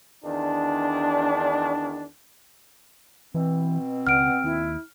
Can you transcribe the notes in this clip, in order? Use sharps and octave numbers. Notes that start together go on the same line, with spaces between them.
E2 D#3 D4
B2 E3 C4
C#2 F#5 F6 D7
D#2 E4